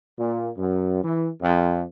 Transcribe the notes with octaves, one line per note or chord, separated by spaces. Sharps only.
A#2
F#2
E3
F2